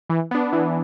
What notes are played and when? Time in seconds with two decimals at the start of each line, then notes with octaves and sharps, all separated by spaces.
0.10 E3
0.31 B3 D4
0.53 E3